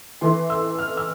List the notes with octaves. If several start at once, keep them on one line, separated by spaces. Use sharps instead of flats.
E3 A3 E4 C6
E6
F6
E6